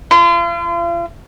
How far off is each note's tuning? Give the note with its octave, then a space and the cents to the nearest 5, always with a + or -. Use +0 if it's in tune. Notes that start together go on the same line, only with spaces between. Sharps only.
F4 -40